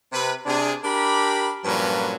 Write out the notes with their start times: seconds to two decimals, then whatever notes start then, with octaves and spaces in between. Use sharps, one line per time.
0.13 C3 B4
0.46 C3 D4 G#4
0.84 D4 G4 A#4 B5
1.64 G2 A#2 F3 F#3 C#4 B4